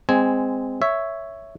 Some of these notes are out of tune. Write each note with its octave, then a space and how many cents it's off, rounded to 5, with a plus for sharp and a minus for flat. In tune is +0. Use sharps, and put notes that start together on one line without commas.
G#3 -15 C4 -15 G#5 +5
C#5 +0 E5 +0